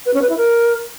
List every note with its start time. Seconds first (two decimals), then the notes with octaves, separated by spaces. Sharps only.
0.06 B4
0.14 C#4
0.22 B4
0.30 E4
0.37 A#4